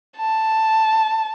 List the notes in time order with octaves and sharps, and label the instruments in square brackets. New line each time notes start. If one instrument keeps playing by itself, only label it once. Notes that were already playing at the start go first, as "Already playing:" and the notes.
[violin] A5